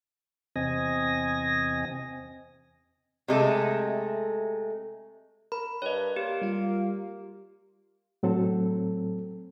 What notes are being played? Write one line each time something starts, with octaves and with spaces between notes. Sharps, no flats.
E2 C3 C4 D#5 G#5 A#6
C3 G#3 A3 A4
A#4 B5
G2 C#5 D#5
A#3 G4
G3 F4
A2 F#3 C4 A4